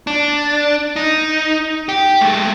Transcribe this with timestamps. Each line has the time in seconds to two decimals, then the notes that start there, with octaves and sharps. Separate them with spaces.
0.07 D4
0.96 D#4
1.89 G4
2.21 G#3 A3